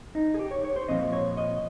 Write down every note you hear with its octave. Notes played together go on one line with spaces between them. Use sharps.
D#4
G#4
G4
C#5
C#5
C5
A#2 F3 C4 D#5
C#5
D#5